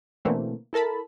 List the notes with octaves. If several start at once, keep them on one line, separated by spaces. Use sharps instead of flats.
B2 D3 E3 A3 A#3 C4
E4 A4 A#4 A5 B5